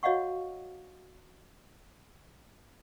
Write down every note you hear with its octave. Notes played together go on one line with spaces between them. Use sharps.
F#4 C#5 D#5 F5 F#5 C#6